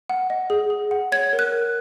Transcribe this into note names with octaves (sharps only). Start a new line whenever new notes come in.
F#5
D#5
G#4
G#4
F#5
C#5 G#6
A#4
F#6
A#4